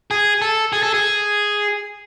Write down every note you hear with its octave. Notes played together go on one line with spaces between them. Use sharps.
G#4
A4
G#4
A4
G#4